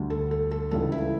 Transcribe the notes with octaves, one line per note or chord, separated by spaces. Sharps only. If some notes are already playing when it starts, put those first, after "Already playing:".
Already playing: D2 D3 G3
A4
A4
A4
C#2 C#3 E3 G3 A4
E4